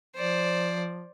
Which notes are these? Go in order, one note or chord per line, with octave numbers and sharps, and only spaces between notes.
F3 C5 D5